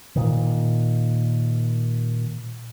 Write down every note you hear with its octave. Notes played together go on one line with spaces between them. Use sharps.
A#2 D#3